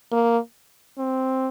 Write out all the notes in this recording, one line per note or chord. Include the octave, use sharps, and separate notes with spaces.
A#3
C4